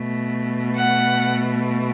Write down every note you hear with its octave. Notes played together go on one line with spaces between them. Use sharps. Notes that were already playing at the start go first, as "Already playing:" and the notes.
Already playing: B2 A3
F#5